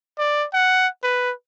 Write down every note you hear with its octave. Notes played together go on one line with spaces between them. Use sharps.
D5
F#5
B4